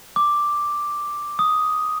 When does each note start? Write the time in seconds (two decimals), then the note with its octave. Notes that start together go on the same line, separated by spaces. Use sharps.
0.16 D6
1.39 D#6